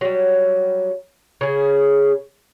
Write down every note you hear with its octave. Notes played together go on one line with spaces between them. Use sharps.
F#3 G3
C#3 G#4